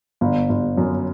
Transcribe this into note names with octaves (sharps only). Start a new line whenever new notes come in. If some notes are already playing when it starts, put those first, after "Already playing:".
G1
G1
F#2